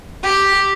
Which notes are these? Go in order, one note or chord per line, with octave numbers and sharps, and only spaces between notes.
G4